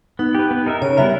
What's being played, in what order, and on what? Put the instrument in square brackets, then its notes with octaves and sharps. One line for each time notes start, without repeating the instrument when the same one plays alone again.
[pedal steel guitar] B3 [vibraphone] D#4
[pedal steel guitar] G4 B4
B3
D#4 A#4 E5
[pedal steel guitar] C#3 [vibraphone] C#5
[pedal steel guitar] G3 B3 E4 A#4 [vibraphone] E5